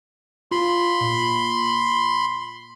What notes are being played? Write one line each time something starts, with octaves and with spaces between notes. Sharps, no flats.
F4 B5 C6
A#2